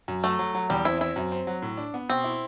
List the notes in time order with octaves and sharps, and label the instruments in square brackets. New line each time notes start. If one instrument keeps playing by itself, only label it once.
[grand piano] F#2
[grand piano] F#3 [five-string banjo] A3
[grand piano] F#3
F#3
[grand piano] E2 [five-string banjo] G3
[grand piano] C4 [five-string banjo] E4
[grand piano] C4 [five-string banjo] E4
[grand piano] F#2
C4
F#3
A2
D4
B3
[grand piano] B2 [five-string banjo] C4
[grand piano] E4